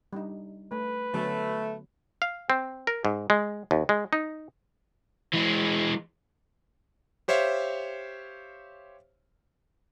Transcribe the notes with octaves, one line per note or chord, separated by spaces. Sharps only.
G3 D4 D#4
A3 B4
D3 F#3 A3 B3
F5
C4
A#4
G#2
G#3
D#2
G#3
D#4
E3 G#3
G4 C5 C#5 E5 F5